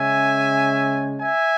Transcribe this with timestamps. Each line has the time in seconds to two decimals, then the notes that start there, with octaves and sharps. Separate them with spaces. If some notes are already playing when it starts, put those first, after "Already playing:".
Already playing: C#3 G#3 C#4 E5 G#5
1.21 E5 G#5